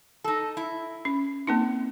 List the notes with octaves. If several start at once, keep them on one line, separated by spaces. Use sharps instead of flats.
D#4 A4
E4
C#4
A#3 C4 D#4